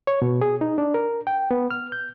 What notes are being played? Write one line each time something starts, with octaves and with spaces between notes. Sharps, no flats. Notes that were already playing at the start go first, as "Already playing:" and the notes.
C#5
B2
G#4
D#4
D4
A#4
G5
B3
F6
G6